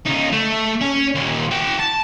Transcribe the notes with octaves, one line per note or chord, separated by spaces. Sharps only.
C#2 D#4
A3
C#4
D#2 A#2
F#4 G5
A5